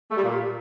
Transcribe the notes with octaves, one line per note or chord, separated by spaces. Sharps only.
A3
G3
A#2